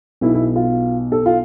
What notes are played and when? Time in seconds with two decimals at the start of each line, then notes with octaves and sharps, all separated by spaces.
0.21 B1 B2 B3 E4
0.34 E4
0.56 F4
1.12 A4
1.26 F4